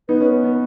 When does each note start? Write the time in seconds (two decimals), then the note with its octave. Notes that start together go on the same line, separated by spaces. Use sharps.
0.09 B3 D#4 B4
0.20 C#4
0.31 B3
0.44 B3